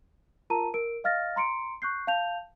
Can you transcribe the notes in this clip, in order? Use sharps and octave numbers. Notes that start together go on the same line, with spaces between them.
F4 A#4 A5 A#5 D#7
A#4 D7
D#5 F5 F6 A6 A#6
A#5 C6 C#7 D7
C#6 F#6 G6 C7
F5 A5 G6 F7